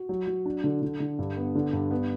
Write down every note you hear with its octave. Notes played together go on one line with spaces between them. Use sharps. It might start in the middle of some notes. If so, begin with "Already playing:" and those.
Already playing: F#4
F#3
F#3
D4
D3
D3
D3
G2
B3
D3
G2
B3